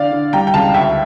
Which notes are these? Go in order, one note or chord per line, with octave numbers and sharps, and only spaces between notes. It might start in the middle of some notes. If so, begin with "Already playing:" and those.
Already playing: D3 D5 F5
D3
G3 G5 A#5
G5
C#2 F5 A5
D2 E5 G5